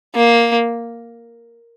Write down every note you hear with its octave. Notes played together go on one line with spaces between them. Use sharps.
A#3